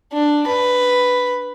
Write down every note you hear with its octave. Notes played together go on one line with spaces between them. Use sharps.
D4
B4